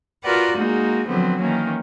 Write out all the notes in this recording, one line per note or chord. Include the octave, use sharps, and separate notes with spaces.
F4 F#4 A#4 B4 D5 F#5
G#3 A#3 D#4 F#4
D3 F3 F#3 B3 C4
D#3 E3 A#3 C#4